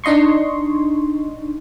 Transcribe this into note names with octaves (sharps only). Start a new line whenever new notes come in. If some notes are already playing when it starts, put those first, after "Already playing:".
D4 D#4 D#5 C6 C#6